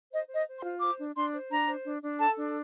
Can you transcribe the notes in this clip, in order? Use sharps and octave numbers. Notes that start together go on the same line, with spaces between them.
C5 D#5
C5
D#5
C5
C6
F4
C5 D6
D4
D4 C6
C5
D4 A#5
C5
D4
D4
A4 A5
D4